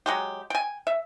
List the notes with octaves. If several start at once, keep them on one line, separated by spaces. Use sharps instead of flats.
F#3 G#3 G4
G5 G#5
E5